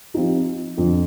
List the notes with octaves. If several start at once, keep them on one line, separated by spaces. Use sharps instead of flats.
F3 C4 D#4 G4
F2 D3 F3